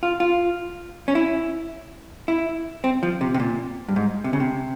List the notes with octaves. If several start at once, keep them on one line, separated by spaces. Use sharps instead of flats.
F4
F4
C#4
E4
E4
C4
F3
C3
C3
A#2
G2
G#2
C3
C#3
C3